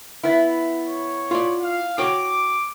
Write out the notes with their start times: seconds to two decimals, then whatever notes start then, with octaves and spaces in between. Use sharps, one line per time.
0.23 B3 E4
0.87 C#5
1.31 F4 D5
1.61 F5
1.98 F#4 C#5 G5 D6